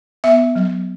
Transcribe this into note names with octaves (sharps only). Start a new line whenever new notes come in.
B3 E5
F#3